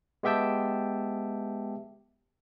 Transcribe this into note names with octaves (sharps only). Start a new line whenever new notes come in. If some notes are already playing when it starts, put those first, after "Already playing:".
G#3 B3 G4 E5 G5 A5